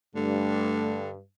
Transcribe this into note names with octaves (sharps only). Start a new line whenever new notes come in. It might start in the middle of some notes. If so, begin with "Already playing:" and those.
G2 D3 A3